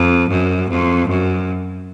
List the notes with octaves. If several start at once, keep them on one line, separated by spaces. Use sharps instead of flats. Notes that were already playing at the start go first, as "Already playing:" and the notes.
Already playing: F2
F#2
F2
F#2